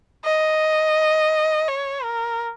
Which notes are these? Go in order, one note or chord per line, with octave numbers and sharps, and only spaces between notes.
D#5
C#5
A#4